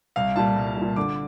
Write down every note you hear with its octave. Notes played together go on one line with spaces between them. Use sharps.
C2 F5
A#2 G3 A5
C2
A#2 G3
D3 D6